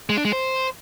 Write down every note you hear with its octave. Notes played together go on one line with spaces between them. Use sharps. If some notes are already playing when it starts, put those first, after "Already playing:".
G#3
D4
G#3
C5